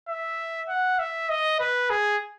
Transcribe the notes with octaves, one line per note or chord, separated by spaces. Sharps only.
E5
F#5
E5
D#5
B4
G#4